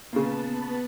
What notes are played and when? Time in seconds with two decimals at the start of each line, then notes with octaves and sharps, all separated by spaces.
0.13 A#2 C#3 B3 B4 A5